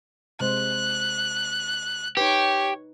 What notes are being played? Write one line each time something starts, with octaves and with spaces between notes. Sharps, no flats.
C3 G#3 C5 F#6
D#4 G4 B4 C#5